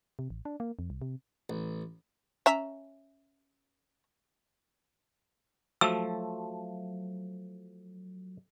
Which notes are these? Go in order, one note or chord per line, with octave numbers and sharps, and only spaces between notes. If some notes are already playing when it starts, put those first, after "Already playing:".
C3
A1
D4
A#3
F2
C2
C3
A1
C#4 E5 A#5
F3 F#3 A3 E6